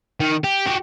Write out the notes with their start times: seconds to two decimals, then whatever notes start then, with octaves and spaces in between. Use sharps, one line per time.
0.20 D#3
0.44 G4
0.66 F#4 G4